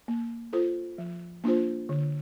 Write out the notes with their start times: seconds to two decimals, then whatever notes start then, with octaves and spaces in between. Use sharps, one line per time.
0.08 A#3
0.53 F4 A4 C5
0.98 F3
1.44 A#3 D4 F4 C5
1.89 D3